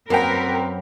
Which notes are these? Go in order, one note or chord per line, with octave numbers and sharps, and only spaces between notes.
F#2 A#3 C4 A#4 B4 F#5 G5